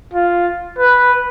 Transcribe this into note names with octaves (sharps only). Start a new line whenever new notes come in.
F4
B4